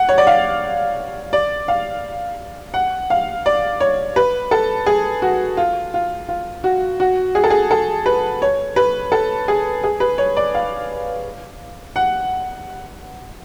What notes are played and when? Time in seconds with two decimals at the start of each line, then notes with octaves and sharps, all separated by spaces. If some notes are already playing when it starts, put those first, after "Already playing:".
Already playing: F#5
0.09 C#5
0.18 D5
0.27 F5
1.33 D5
1.68 F5
2.74 F#5
3.10 F5
3.46 D5
3.80 C#5
4.16 B4
4.51 A4
4.86 G#4
5.22 F#4
5.57 F4
5.94 F4
6.28 F4
6.64 F#4
7.00 F#4
7.35 G#4
7.44 A4
7.50 G#4
7.71 A4
8.06 B4
8.42 C#5
8.76 B4
9.12 A4
9.48 G#4
9.84 G#4
10.00 B4
10.18 C#5
10.37 D5
10.54 F5
11.96 F#5